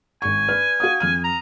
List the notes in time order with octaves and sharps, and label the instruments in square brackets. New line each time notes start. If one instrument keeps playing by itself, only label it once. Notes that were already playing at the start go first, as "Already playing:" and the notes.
[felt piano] G#1 C#6 [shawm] G#5
[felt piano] B4 D5 F6
F#4 F5 D#6
F2 F6 D#7
[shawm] A#5